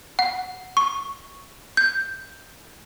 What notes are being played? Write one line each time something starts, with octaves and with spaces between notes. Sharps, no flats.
F#5
C#6
G6